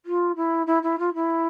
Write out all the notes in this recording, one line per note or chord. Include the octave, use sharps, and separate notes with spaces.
F4
E4
E4
E4
F4
E4